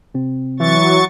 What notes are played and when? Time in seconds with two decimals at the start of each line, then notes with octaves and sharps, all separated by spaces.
0.14 C3 C4
0.60 E3 F#3 C#6 A6